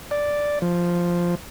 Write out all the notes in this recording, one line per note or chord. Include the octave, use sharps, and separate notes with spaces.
D5
F3